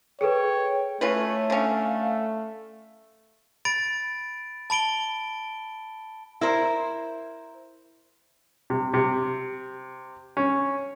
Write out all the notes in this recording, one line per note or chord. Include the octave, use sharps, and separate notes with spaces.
G#4 A4 B4 C#5 G5
A3 C#4 E4 F4 B4 C#5
D3 C#4 F5
B5 A6 D7
A5 B5 D7 G7
E4 A#4 C5
C3
C3
C#4